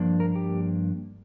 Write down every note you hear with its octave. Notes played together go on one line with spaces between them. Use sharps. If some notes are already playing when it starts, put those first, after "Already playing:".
Already playing: G2 F3 A#3 D4
A#4
G4